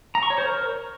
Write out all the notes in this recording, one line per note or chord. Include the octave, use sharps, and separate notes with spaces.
A#5
C#6
C#5
C5
A#4